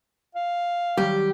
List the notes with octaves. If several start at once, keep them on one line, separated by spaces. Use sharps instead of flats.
F5
D#3 F#3 G3 G4